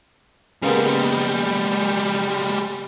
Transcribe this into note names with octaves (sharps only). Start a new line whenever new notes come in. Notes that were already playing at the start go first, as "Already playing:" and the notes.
C#3 G3 G#3 A#3 B3